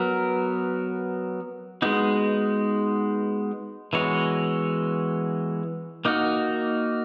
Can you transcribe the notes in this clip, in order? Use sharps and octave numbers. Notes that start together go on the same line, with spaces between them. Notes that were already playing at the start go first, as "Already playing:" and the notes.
Already playing: F#3 B3 F#4 A#4
G#3 B3 D#4 F#4
E3 G#3 B3 F#4 C#5
A#3 D#4 F#4